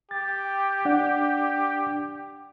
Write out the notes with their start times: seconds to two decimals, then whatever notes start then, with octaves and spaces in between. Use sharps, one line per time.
0.11 G4 A6
0.85 D4 D5 F#5